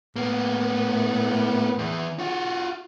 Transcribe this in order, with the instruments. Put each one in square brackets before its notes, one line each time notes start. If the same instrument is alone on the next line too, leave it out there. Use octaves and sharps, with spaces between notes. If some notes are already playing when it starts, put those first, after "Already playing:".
[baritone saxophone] A2 [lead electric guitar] A#3 B3
[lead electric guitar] E2 E3
F4 F#4